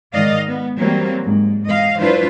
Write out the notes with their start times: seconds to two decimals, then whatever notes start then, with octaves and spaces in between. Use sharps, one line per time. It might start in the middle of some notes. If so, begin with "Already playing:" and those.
0.13 G#2 D#3 D5 D#5 F5
0.46 B3
0.78 E3 F#3 G3 A#3 C4
1.23 G#2
1.64 E3 D#5 F5
1.99 F#3 D4 E4 F4 B4 C5